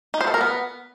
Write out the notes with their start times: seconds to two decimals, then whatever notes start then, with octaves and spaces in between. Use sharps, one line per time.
0.14 D#4
0.21 C5
0.27 A4
0.34 A#4
0.41 B3